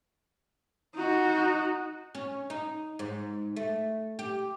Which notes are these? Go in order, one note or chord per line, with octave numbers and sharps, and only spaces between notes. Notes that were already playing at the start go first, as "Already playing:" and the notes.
D#4 F#4
C#4
D#4
G#2
A3
G4